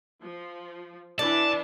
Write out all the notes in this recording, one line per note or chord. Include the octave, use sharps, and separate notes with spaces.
F3
E3 D4 D5 A5